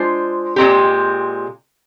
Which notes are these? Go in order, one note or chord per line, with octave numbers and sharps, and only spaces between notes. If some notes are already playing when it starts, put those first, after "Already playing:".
Already playing: G#3 D4 F4 C5
A#2 G#3 C4 G4